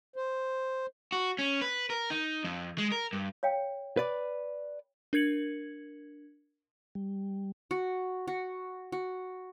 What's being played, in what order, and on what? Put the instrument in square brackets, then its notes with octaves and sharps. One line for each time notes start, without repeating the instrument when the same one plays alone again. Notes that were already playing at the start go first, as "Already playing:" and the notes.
[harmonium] C5
[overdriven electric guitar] F#4
C#4
B4
A#4
D#4
F2
G#3
A#4
G2
[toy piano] C#5 F5 G5
[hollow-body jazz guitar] B4 D5
[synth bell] D4 A#4 G#6 C#7 F#7
[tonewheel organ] G3
[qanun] F#4
F#4
F#4